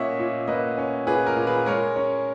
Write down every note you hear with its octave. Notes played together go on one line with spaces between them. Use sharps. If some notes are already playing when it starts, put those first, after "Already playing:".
Already playing: A#2 A#3 C#4 C#5 D#5 E5 F#5
A#2
A#3 B4 D#5
C#4
A#2 G#4 B4
A#4
A#2
G#4 B4
G#3 A#4 C#5
C#4